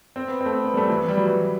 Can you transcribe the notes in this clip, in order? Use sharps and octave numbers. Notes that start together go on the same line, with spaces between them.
C4
B3
C4
A3
B3
B3
G3
A3
E3
B3
G3
F#3
E3